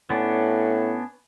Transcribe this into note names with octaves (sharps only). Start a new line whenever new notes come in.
A2 B3 C#4 D4